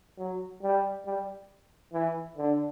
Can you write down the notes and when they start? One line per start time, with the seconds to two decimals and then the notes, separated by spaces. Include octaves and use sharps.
0.18 F#3
0.63 G3
1.06 G3
1.93 E3
2.38 D3